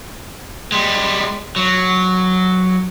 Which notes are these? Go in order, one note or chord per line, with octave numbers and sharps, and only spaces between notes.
G3 G#3
F#3